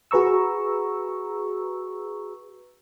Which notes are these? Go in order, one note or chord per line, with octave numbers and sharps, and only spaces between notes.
F#4 G#4 B4 A#5 C#6 E6